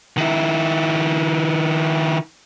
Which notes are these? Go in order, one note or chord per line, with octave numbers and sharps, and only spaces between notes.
D#3 E4